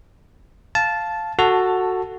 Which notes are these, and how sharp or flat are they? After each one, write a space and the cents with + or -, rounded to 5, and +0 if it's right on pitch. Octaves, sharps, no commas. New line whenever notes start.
F5 +0 A5 -10
F#4 +0 A4 +15 A5 +0